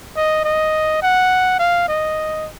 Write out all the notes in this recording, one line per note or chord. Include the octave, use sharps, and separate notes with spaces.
D#5
D#5
F#5
F5
D#5